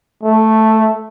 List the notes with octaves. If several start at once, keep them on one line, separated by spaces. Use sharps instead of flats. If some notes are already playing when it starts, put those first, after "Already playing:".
A3